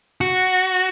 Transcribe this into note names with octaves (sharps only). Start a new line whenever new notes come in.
F#4